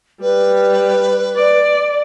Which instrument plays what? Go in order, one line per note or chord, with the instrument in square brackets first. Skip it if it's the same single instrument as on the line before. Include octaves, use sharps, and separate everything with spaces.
[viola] G3 [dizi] B4
[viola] D5